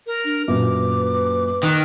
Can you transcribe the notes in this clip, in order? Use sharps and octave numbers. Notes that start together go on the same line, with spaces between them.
A#4
D4
F#2 A#2 B4 D6
D#3 F#6